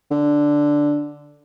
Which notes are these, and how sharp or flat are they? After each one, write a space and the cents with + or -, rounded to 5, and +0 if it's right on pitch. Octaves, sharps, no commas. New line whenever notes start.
D3 +0